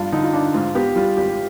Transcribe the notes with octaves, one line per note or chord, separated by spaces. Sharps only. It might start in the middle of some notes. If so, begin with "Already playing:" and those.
Already playing: G2 B3 D4 F4
D3 D#4
F4
D4
G#2 F4
B3 G4
G3 F4
G#1 G4